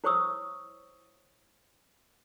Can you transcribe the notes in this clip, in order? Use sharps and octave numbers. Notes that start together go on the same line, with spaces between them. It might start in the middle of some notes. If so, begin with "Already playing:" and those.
E4 C5 C#5 C#6 D#6 E6